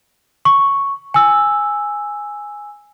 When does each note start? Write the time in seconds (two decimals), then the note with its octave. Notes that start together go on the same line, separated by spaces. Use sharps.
0.45 C#6
1.14 G#5 E6